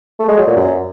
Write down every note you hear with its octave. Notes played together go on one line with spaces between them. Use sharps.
A3
G#3
F#3
A#2
F#2